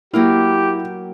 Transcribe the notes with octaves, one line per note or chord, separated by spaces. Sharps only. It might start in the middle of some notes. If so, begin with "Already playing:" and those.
F#3 A#3 E4 G4 F5